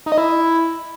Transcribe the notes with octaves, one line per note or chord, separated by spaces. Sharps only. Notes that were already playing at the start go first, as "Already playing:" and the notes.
D#4
D#5
E4